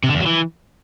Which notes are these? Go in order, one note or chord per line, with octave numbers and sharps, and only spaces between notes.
C3
D3
E2
F#3
E3